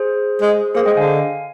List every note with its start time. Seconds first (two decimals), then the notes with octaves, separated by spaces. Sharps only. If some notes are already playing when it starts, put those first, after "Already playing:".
Already playing: G#4 C5
0.42 G#3
0.75 A#3 G#4 C5
0.86 G#3 D#5 G5
0.97 D3 F5 G#5